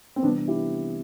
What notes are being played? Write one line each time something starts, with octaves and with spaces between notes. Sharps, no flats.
C4
C3 E3 G3 B3 D4
E4 G4